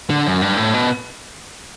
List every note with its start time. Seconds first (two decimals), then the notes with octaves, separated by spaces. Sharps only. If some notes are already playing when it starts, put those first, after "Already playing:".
0.10 D3
0.26 F#2
0.42 G2
0.57 A2
0.74 B2